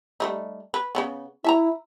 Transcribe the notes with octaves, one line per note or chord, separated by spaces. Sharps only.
G3 A3 D#4
B4
C#3 E3 B3
E4 E5 A5 A#5